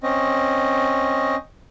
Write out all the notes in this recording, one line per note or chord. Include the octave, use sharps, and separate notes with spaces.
C4 C#4 D#5